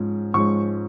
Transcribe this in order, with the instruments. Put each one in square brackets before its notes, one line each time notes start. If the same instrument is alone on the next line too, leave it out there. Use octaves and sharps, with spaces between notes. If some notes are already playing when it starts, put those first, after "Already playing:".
Already playing: [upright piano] G#2 F3 G#3 C#4
G#2 F3 G#3 C#4 C#6